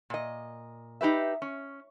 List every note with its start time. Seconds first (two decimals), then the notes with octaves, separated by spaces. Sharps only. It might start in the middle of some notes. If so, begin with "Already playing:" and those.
0.10 A#2 D#5
1.01 D#4 G4 B4 E5
1.42 C#4